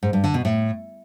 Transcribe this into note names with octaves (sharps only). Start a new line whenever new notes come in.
G#2
G2
D3
B2
A2